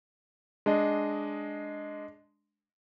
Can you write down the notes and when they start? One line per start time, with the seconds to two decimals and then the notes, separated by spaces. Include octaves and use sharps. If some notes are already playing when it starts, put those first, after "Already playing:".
0.66 G#3 D4 D#5